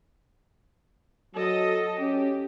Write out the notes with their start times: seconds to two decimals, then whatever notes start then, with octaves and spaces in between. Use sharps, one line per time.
1.35 F#3 A4 D#5
2.00 C#4 G4